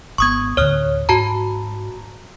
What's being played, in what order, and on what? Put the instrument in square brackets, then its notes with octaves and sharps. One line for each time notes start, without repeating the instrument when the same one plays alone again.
[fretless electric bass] G#1 B3 [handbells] C#6 D#6 G#6
[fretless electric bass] D2 A2 D3 [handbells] C#5 D#6 F6
[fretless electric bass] G#2 [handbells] F#4 A5 A#5